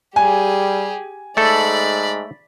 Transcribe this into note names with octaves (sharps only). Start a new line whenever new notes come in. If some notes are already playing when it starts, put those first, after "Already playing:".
G3 G4 G#4 G#5
G#2 A3 A4 D5 B5